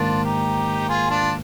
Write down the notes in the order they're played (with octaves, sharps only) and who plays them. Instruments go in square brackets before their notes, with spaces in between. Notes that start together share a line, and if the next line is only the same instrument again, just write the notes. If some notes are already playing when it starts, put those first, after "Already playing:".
Already playing: [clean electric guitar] G#2 D#3 A#3 [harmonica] D4 F4
[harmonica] D#4 G4
F4 G#4
D4 F4